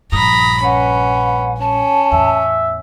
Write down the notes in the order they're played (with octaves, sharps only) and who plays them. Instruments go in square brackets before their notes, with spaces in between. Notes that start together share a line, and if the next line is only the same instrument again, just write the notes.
[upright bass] A#1 G2 [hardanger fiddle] A#5 B5 [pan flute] D#6
[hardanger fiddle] C#4 [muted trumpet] B4 [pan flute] F#5
[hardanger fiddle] C#4 [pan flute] A5
[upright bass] E2 A2 [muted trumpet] E5